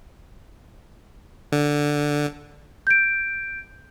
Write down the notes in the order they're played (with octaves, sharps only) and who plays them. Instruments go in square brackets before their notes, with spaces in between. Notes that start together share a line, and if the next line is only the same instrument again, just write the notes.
[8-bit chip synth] D3
[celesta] G6 D7